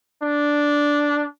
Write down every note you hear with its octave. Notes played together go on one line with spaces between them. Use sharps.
D4